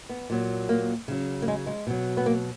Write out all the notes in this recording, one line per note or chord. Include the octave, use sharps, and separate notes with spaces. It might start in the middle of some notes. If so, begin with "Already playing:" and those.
B3
A#2 F#3
A#3
C#3 F#3
A#3
G#3
G#3
B2 F#3
B3
A#3